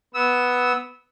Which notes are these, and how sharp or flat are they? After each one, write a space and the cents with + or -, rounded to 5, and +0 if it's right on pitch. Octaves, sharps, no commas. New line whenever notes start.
B3 +0 E6 -20